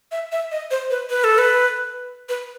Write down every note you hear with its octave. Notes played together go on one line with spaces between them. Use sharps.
E5
E5
D#5
C5
B4
B4
A4
B4
B4